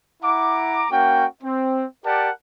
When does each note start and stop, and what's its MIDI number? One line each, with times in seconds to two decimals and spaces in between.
0.23 0.86 64
0.23 0.86 78
0.23 0.86 82
0.23 0.86 86
0.91 1.26 58
0.91 1.26 61
0.91 1.26 66
0.91 1.26 79
1.43 1.84 60
2.05 2.30 67
2.05 2.30 70
2.05 2.30 74
2.05 2.30 78
2.05 2.30 81